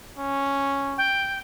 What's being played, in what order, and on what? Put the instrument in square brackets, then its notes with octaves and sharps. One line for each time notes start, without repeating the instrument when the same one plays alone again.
[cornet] C#4
[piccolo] G5